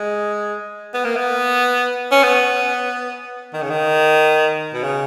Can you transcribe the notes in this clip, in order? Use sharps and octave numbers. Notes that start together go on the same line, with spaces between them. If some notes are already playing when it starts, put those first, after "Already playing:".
Already playing: G#3
B3
A#3
B3
C#4
B3
D#3
C#3
D#3
B2
C#3